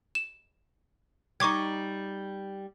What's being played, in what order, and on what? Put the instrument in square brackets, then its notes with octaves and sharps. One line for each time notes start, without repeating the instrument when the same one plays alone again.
[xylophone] E7
[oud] G3 D#4 [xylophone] C#6 D6 G#6